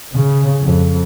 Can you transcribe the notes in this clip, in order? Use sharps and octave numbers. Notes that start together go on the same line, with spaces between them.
C#3
F2